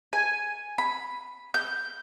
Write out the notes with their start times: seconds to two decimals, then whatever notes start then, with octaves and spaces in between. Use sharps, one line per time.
0.13 G#5
0.78 B5
1.54 G6